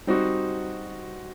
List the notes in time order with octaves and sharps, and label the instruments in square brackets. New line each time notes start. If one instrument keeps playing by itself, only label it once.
[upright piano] G3 C4 D#4 F#4